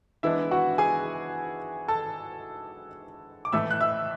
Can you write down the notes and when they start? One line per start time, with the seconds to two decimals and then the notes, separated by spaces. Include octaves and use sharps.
0.23 E3 G#3 B3 D4 E4 E5
0.51 F#4 F#5
0.78 G#4 G#5
1.88 A4 A5
3.45 D6
3.52 A2 E3 A3 E5 E6
3.71 F#6
3.81 E5 E6